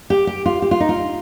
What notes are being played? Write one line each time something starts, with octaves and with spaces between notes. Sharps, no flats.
G4
G4
F4
G4
F4
D#4
F4